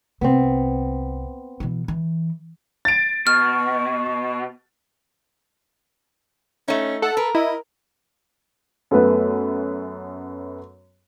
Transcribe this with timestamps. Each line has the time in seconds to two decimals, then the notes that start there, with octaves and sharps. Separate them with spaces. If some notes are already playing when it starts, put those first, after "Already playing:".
0.21 C2 C3 B3 C4
1.60 B2 E3
1.88 E3
2.85 A6 D7
3.27 B2 C#6 F6
6.68 A3 C#4 D#4
7.02 A4 F#5
7.17 A#4 B4
7.35 E4 D#5
8.91 F#2 A3 B3 B4